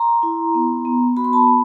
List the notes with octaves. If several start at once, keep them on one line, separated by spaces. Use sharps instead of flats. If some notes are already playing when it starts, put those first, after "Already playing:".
Already playing: A#5 C6
E4
B3
B3
F#4 B5
C6
A5 B5
B3